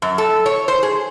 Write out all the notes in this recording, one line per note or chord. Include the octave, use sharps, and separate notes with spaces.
F#2
A4
C#5
C5
G#4